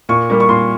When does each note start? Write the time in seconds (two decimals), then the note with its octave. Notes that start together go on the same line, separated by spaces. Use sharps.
0.09 A#2 C#6
0.30 G3 A#3
0.40 C#6
0.49 A#2 C6